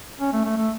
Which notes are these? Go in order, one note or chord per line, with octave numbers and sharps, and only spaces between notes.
C#4
A3
A3
A3